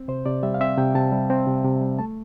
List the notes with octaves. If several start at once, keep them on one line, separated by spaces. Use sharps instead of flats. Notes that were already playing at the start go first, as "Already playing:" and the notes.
Already playing: C4
C3 C5
C3 D5
G3 E5
F5
C4 E5
C3 G5
C3 A5
G3
C4
C3
C3
G3
A3 A5